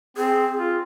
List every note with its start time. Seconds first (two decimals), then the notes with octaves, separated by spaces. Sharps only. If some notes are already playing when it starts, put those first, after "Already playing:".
0.17 C4 G#4
0.58 F4